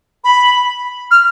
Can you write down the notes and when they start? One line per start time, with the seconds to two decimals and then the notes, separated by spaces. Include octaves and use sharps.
0.24 B5
1.11 F6